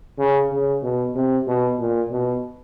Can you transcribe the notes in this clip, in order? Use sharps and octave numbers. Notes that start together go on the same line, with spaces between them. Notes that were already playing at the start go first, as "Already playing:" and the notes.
C#3
C#3
B2
C3
B2
A#2
B2